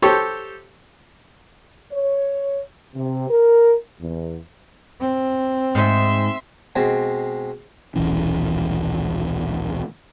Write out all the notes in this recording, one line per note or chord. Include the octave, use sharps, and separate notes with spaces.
G4 A4 C5 C#5
C#5
C3
A#4
E2
C4
G#2 E5 C6
B2 G#3 C4
D#1 B1 E3 C#4